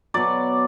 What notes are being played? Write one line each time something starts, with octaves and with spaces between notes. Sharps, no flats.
B2 F#3 D5